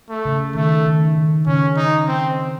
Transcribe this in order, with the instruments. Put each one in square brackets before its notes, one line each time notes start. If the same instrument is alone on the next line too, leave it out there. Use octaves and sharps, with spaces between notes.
[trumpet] A3
[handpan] C#3
[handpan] D#3 [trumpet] A3
[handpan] D#3
D#3
[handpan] C#3 [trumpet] C#4
[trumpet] D#4
C4